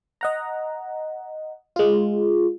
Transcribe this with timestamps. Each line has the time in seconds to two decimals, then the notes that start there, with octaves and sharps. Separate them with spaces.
0.21 D#5 F#5 A#5
1.76 G#3 F4